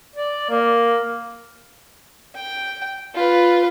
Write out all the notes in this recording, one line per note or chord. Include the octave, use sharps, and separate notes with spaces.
D5
A#3
G5
F4 B4